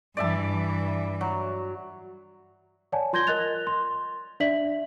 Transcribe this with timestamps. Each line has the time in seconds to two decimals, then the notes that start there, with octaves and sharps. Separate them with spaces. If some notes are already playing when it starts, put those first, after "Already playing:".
0.17 G2 E3 D5 E5 A5
1.21 F#3
2.92 C#5 D5 F#5 G#5 A5
3.13 F4 C6 G6 G#6 A#6 G7
3.27 A#4 D#5 F#6 A6 F7
3.67 C6
4.40 D4 D5 E5 B6 F#7